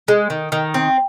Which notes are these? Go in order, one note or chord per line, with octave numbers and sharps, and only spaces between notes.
G#3
D#3
D#3
C4